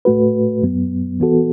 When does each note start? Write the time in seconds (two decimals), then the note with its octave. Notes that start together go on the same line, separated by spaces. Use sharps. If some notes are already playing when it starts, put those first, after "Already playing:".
0.05 A2 A3 F#4 B4
0.62 F#2 F#3 B3
1.20 E3 B3 F#4 A4